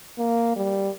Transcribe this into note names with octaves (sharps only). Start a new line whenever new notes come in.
A#3
G3